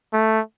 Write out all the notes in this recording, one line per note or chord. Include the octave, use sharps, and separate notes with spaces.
A3